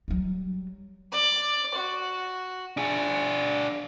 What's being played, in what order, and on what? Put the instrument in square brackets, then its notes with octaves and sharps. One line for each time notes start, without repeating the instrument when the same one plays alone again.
[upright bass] F#3 G3
[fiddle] D5
F#4
[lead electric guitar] D4 G#4